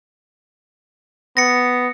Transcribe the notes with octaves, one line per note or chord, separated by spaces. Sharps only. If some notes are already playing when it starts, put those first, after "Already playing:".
B3 A#6 C#7